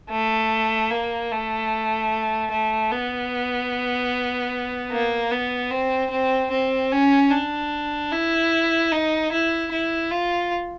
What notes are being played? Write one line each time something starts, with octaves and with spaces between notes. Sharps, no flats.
A3
A#3
A3
A3
B3
A#3
B3
C4
C4
C4
C#4
D4
E4
D#4
E4
E4
F4